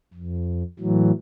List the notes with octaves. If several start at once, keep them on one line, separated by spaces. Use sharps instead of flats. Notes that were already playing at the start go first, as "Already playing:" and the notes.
F2
A2 E3 F#3